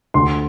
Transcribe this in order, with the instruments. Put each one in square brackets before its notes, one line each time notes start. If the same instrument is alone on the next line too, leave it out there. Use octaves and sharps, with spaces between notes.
[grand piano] D2 C6